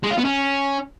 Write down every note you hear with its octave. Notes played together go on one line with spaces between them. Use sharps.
G#3
F4
B3
C#4